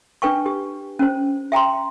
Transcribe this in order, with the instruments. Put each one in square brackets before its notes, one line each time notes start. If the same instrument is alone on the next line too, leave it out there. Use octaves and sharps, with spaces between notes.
[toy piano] D4 B4 G5 C#6
G4
C#4 C5
E5 G5 A#5 C6